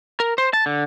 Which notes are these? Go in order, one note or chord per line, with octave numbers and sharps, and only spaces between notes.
A#4
C5
A5
D3